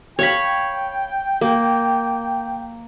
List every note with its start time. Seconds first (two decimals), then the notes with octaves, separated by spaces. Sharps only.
0.19 C#5 F5 G5 B5
1.41 A#3